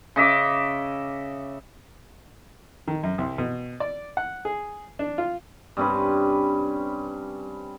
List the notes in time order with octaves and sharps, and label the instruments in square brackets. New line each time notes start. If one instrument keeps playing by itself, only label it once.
[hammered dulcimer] C#3 D#5 E5 D6
[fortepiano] D#3
F#2
C2
B2
D5
F#5
G#4
D4
F4
[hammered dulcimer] G2 C3 C#4 B4